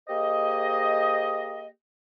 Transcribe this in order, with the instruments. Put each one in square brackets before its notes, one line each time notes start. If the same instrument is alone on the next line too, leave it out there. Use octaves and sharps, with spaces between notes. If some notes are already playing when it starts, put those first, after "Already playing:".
[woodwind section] A#3 G4 G#4 C5 D#5